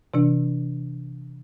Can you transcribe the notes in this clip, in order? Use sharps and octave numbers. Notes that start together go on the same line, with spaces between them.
C3 E3 D4